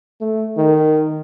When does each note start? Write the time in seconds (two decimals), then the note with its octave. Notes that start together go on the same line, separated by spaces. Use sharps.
0.21 A3
0.57 D#3